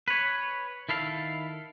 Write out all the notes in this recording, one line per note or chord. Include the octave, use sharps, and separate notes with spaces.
B4 C#5
D#3 E4 A4 F5